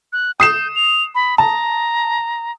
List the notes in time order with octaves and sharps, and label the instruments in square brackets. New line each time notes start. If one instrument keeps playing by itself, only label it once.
[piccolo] F#6
[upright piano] D#6 C7 E7 [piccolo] G6
[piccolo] F7
B5
[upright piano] A5 [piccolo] A#5